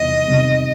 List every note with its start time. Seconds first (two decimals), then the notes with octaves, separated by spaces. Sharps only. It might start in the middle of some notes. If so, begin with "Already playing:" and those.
Already playing: E2 C3 D#3 G3 C4 D#5
0.26 C3 D#3 G3 C4